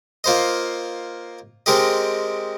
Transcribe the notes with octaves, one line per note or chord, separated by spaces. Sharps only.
A#3 F4 C5 D#5
G#3 C4 G4 A#4 D#5